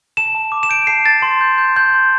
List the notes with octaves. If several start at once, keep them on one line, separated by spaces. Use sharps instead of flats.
A5 E7
A5
D6
E7
G6 D7
A5 C7
A5 A6
C6
G6
G6
C6 G6
C6